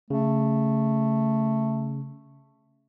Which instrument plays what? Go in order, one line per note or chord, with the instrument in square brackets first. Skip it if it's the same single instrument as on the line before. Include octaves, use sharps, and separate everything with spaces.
[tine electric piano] C#3 [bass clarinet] A3